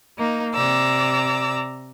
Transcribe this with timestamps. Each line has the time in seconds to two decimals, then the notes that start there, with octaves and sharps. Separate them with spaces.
0.18 A#3 D#4
0.53 C3 D5 A#5 D6 E6